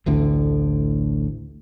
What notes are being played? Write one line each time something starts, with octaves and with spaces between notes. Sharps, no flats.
A1 D2 A2 D3